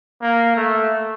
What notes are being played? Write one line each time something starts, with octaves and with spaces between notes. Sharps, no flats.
A#3
A3